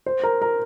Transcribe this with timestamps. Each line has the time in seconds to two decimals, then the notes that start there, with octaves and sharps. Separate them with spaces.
0.06 C5
0.23 A#4
0.42 A#4